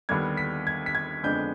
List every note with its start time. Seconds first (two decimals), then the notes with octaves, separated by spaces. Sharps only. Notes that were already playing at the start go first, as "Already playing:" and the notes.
0.09 D#2 D3 G3 B3 D4 G#6
0.37 B6
0.67 G#6
0.86 B6
0.95 G#6
1.23 F2 D3 G#3 B3 D4 G6